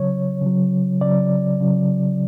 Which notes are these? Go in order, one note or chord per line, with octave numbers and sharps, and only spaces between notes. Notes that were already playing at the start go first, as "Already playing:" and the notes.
Already playing: C#3 F#3 C#5
C#3 F#3
C#3 F#3 D5
C#3 F#3